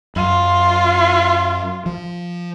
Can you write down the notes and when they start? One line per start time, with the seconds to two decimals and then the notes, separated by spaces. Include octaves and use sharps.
0.16 F#2 F4
1.86 F3